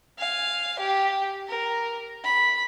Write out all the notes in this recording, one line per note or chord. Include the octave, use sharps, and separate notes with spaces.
F5 G#5
G4
A#4
B5